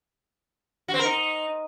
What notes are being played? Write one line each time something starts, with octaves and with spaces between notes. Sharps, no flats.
F#4
C4
A#4
D#4